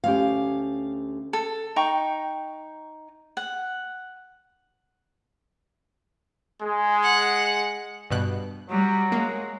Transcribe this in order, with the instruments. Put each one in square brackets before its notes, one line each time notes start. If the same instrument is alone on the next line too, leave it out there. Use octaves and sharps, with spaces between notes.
[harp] D2 C#4 G4 [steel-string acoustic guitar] F5
[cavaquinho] A4
D#4 G5 C#6
F#5
[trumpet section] G#3
[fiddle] F#5
[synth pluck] G2 B2 F#6
[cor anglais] F#3 [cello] G3
[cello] G#3 [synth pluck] A#3